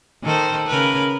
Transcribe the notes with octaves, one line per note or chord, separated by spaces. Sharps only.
D#3 A4 C5
C#3 A#4 B4